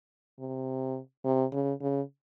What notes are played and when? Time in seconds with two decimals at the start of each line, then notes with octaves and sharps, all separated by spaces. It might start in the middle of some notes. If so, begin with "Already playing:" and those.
0.39 C3
1.25 C3
1.53 C#3
1.81 C#3